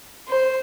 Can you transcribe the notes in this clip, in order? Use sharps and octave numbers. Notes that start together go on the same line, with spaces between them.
C5